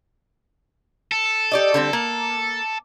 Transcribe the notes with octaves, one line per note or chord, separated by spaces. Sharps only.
A4
G4 D5 D#5
D3 G3 C4
A#3